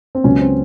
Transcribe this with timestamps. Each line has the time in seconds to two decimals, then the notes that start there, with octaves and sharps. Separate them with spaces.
0.15 C4
0.24 C#2 C#3 F#3 B3 C#4
0.41 C4